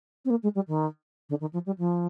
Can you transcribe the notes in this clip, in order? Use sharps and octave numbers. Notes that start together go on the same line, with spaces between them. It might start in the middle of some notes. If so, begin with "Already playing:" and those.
C4
A#3
G#3
G3
D#3
D3
D#3
F3
G3
F3